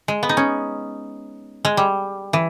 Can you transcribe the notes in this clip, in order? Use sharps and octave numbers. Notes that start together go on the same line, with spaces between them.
G#3
B3
D#4
C#4
G#3
G3
E3